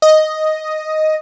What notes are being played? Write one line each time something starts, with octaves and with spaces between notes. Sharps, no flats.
D#5